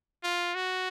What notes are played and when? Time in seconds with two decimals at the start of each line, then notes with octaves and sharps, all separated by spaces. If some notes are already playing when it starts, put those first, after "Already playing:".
0.24 F4
0.55 F#4